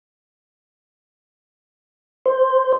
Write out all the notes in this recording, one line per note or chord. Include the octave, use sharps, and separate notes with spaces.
C5